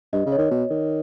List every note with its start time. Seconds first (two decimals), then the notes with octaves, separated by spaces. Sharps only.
0.13 G2 D#5
0.26 C#3
0.32 C#5
0.38 D#3
0.51 B2
0.70 D#3